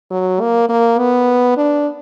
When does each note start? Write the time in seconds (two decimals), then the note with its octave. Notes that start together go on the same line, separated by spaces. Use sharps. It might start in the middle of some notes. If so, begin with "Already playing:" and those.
0.11 F#3
0.41 A#3
0.69 A#3
0.99 B3
1.57 D4